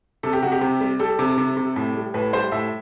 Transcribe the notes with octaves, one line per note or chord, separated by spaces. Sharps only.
C3 A4
G4
C3 F#4
G4
C3
G3
G3 A4
C3
C3
C3
A2
G3
A2 B4
G3 C5
A2 E5